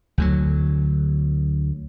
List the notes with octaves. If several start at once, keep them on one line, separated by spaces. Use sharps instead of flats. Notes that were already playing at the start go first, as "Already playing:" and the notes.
D2 D3 F#3